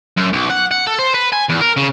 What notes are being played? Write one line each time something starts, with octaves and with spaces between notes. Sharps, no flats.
F#2
B1
F#5
F#5
A4
C5
B4
G#5
E2
A#4
C#3